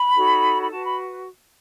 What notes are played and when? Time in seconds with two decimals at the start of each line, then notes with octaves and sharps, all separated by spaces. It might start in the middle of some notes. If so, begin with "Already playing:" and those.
Already playing: B5
0.15 D#4 F#4 A4 C#5
0.63 B5
0.71 F#4 B4 A5
0.85 B5